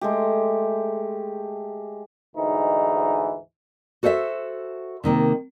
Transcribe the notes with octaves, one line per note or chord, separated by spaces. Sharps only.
G#3 A3 G4
D2 G#2 E3 D#4
F#4 A4 C5 D#5 E5
C3 D#3 A#3